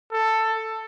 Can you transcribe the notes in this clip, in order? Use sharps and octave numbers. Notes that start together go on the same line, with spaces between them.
A4